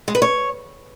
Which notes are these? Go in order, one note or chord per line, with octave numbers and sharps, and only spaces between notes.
G#3
B4
C#5